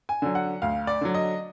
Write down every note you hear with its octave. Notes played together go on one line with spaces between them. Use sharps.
G#5
D3 F#3
F#5
D2 F5
D5
D3 F#3
D#5